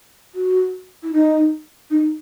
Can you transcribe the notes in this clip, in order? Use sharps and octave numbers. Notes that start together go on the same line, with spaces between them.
F#4
E4
D#4
D#4